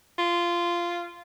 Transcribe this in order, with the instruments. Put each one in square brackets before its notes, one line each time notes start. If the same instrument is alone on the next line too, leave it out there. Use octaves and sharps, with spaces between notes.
[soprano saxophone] F4